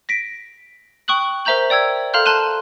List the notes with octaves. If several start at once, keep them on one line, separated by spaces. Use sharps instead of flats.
A#6 B6 D7
G5 C#6 D#6 F#6 F#7
A#4 C5 E5 A#5 G6 F#7
D5 G5 E6 G#6
A4 F5 A#5 C6 F6 G6
A5 C6 F#6 D#7 E7